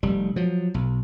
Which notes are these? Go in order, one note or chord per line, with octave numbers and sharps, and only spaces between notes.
F1 G3
F3 F#3
B1